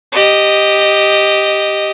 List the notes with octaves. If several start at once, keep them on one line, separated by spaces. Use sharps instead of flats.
G4 D#5